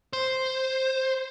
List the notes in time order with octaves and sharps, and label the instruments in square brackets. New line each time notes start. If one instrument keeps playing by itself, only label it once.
[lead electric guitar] C5